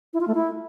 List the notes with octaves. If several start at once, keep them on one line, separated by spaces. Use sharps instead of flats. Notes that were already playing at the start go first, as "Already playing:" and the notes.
E4
F4
A3
E4